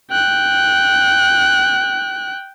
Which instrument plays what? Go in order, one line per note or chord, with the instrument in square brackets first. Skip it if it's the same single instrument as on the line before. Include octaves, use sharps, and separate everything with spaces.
[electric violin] G5 F#6